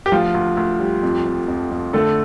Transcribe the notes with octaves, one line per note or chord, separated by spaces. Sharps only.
G4
D2 F3 F4
D2
D2
G3
F2
F2
F2
F2
D3 A3 A4